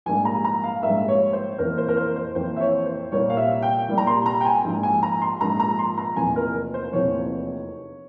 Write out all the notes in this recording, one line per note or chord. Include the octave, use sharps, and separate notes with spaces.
A#1 G#2 G3 A#3 G#5
A#5
A#5
F5
A#1 G#2 G3 A#3 E5
C#5
C5
F2 E3 A#3 A#4
C5
A#4
C5
C5
F2 E3 A#3 C5
E5
C#5
C5
C2 A#2 G3 A#3 C#5
F5
E5
G5
C2 A#2 G3 A#3
A#5
C6
A#5
G5
G#5
A#1 G#2 F3 A#3
G#5
A#5
C6
A#1 G#2 F3 A#3 A#5
A#5
C6
A#5
F1 E2 C3 F3 A#3 G#5
A#4
C5
F1 E2 C3 F3 A#3 C#5